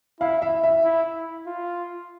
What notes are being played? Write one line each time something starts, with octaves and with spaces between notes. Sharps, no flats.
E4 F5
E5
E5
E4
F4